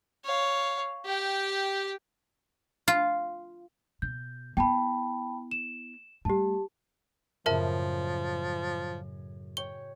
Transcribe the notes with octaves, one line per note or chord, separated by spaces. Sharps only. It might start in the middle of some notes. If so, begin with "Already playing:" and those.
C#5 F5
G4 G5
F4
B2 G6
B3 E4 G5 A5 B5
E7
G3 A3 G4 A5
F#2 A2 C#3 F3 A#4 E5 A5
C#5 G5 C#6 G7